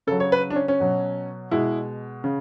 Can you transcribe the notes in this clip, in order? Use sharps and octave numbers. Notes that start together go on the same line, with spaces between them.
C#3 F#3 A4
C#5
B4
D4
C#4
C#4
B2 F#3
B2 G#3 E4
C#3